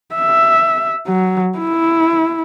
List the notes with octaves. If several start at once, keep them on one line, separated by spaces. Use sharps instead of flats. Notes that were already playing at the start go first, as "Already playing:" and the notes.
E5
F#3
E4